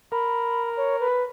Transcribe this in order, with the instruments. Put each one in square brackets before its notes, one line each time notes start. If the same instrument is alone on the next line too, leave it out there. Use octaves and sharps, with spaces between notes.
[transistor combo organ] A#4 [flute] B5
[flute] C#5
B4